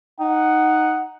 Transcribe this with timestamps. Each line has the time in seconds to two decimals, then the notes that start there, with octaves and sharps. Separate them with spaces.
0.20 D#4 F#5